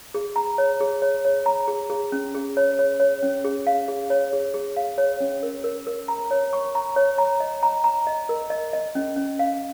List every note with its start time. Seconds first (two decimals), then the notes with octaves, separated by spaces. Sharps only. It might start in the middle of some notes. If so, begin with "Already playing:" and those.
0.14 G#4
0.36 A#5
0.58 C#5
0.80 G#4
1.02 C#5
1.25 C#5
1.46 A#5
1.68 G#4
1.90 G#4
2.12 C#4
2.35 G#4
2.57 C#5
2.79 C#5
3.00 C#5
3.23 C#4
3.44 G#4
3.67 F5
3.88 G#4
4.10 C#5
4.33 G#4
4.54 G#4
4.76 F5
4.98 C#5
5.20 C#4
5.43 A#4
5.64 A#4
5.87 A#4
6.08 A#5
6.31 C#5
6.53 C#6
6.75 A#5
6.96 C#5
7.18 A#5
7.40 D#5
7.63 A#5
7.84 A#5
8.07 D#5
8.29 A#4
8.50 D#5
8.73 D#5
8.95 C#4
9.16 C#4
9.39 F5